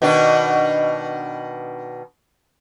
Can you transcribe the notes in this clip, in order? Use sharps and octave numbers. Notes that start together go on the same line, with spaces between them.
B2 D#3 D4